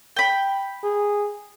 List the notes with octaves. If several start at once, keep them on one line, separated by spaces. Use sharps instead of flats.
G5 B5
G#4